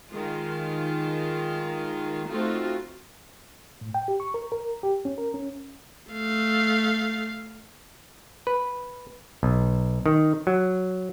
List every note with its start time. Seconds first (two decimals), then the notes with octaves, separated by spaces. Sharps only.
0.13 D#3 G#3 F4
2.30 A3 C4 D#4 F4 F#4
3.81 A2
3.94 G5
4.08 G4
4.20 C#6
4.34 A#4
4.52 A#4
4.83 G4
5.05 C#4
5.18 A#4
5.34 C#4
6.11 A3 F5
8.47 B4
9.43 B1
10.06 D#3
10.47 F#3